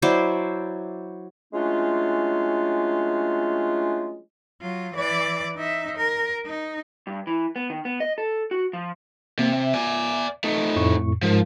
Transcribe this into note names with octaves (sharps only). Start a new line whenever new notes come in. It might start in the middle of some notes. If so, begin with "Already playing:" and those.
F#3 E4 C5 D5
F#3 G#3 A3 C#4 D4 F4
F#3 F4
E3 D5
D#4 E5
A#4
D#4
G2
E3
B3
D#3
B3
D#5
A4
F#4
F3
C3 A#3
E5
D5 G#5
A3 D#4
F2 A2 C#6
G#2 F3 G#3 A#4